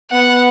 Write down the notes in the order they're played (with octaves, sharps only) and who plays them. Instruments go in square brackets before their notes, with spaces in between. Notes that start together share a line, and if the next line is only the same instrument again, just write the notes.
[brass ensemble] B3 [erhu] F#5